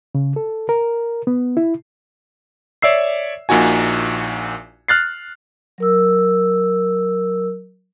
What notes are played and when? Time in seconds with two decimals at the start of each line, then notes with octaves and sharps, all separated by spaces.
0.15 C#3
0.36 A4
0.69 A#4
1.27 B3
1.57 E4
2.82 C#5 D5 E5 E6 C7
3.49 A#1 A#2 D#4 F#4 G#5
4.88 F6 F#6 A6 C7
5.78 F#3 A#4 E6